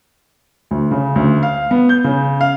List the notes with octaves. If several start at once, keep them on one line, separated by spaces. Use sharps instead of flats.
D2
C#3
D2
F5
B3
G6
C#3
F5